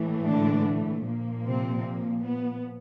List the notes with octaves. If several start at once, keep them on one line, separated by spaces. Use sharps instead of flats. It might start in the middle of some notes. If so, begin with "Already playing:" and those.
Already playing: A2 E3 A3
D3 D4
A#2 F3 A#3
C3 C4
A#3
B3